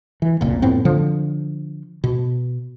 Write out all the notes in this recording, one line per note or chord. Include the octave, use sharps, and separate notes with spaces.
E3
F1 C#2 A#2
F2 A2 B3 C4
D3 F3
B2